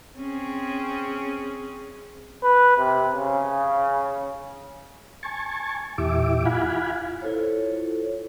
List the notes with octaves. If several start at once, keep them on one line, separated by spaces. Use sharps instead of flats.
C4 C#4 G#4
B4
C3
C#3
G#5 A5 C#6
E2 A#2 E4 G4 E5 D6
E4 F4 F5 F#5 G#5 B5
E4 F4 A4 C5 C#5